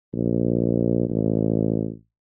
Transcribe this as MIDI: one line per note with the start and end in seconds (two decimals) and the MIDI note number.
0.14 1.09 34
1.09 1.91 33